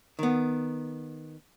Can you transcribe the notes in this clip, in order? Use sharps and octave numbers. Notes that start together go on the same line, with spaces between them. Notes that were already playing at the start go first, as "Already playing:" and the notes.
D#3 B3